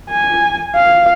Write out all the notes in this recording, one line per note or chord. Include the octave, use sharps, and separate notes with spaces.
G#5
F5